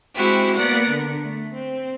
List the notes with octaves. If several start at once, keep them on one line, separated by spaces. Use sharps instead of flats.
G#3 C4 E4 F#4 G4
A#3 B3 A#4 D5 F#5
D3
A3
C4